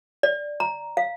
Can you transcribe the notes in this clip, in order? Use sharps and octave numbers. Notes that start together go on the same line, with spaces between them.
D5
A#5
F5